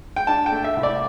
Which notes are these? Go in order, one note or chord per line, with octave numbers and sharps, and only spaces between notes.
G5
D4 A5
G5
A3
E5
C2
D5